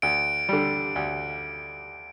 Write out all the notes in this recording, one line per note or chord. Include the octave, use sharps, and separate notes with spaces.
D2 D7
D3 G3
D2